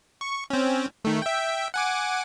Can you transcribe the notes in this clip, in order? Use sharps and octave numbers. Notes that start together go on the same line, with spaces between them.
C#6
C4 C#4
D#3 A3
E5 G5
F#5 G#5 D6